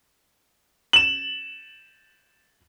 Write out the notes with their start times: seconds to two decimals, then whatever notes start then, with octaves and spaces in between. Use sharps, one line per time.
0.93 E7 F#7